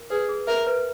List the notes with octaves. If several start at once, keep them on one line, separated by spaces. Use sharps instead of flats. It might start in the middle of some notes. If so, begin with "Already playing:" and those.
Already playing: A#4
G#4 B4
G#4
A#4 E5
B4